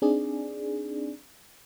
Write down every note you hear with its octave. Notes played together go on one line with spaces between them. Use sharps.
C4 D4 D#4 G#4 D5